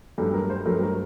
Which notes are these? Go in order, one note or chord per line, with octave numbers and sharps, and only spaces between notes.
G2 F#3 A3 A4
A#4
C5
G2 F#3 A3 A#4
A#4